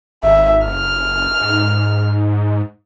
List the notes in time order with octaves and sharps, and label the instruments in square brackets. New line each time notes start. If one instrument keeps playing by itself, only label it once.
[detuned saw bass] G#1 [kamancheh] E5
[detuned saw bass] F#1 [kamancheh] F6
[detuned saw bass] G#2